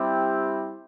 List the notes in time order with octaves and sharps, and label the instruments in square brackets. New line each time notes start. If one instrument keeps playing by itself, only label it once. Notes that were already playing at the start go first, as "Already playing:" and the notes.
Already playing: [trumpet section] G3 C4 E4 G4